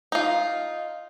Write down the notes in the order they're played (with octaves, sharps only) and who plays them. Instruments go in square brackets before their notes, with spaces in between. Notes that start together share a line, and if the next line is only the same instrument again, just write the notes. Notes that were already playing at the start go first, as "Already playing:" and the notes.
[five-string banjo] D#4 F4